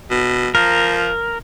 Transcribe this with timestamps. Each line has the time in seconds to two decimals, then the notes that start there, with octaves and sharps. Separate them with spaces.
0.10 B2
0.55 F3 A#4